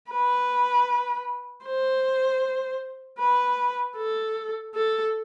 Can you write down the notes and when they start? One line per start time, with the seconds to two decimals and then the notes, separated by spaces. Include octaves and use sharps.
0.11 B4
1.66 C5
3.19 B4
3.97 A4
4.75 A4